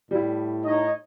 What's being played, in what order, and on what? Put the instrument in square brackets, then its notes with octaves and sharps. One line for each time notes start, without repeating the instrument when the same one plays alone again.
[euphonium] A2 [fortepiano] G3 E4
[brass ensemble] D#4 C#5 D#5